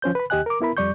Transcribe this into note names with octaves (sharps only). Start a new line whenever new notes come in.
F3 C#4 C5 G6
B4 B5
D#2 G4 D#5 G#5 F#6
A#4 D6
B3 E4 A#4 B5
F2 G3 D5 C#6 G6